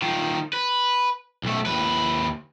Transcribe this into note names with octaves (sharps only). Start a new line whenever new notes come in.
D#3 F4
B4
B1 A3
D#2 B4